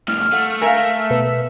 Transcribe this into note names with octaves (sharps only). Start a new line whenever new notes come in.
C2 A2 F6
A3 F5 F#5
A#4 E5 F5 G#5
B2 B4